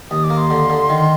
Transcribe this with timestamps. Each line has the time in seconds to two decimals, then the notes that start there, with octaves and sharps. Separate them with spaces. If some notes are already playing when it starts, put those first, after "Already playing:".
0.11 D#2 D#6
0.24 D6
0.30 A#3
0.37 C6
0.50 D3
0.70 D3
0.90 D#3